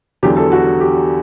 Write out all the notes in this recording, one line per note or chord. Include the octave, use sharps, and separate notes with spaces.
E2 D3 F#3 G4
A4
F#4
G4